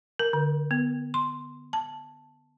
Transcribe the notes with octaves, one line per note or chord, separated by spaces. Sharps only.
A#4
D3
B3
C6
A5